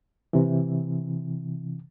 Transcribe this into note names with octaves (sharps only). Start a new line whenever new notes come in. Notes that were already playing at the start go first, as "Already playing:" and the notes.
C3 E3